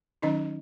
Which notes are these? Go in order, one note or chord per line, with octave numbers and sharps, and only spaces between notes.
D#3 F#3 C#4 D#4 D#5